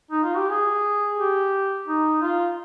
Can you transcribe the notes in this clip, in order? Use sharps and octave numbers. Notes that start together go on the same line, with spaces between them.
D#4
F4
G4
G#4
G4
D#4
F4